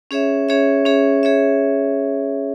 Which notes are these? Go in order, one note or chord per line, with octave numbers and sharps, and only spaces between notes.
C#4 G#4 C#5 E5
C#4 G#4 C#5 E5
C#4 G#4 C#5 E5
G#4 C#5 E5